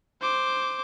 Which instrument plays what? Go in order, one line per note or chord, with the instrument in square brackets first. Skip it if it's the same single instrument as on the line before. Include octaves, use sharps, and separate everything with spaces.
[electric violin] C5 D6